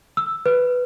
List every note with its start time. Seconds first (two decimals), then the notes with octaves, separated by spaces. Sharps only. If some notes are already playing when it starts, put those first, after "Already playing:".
0.17 E6
0.46 B4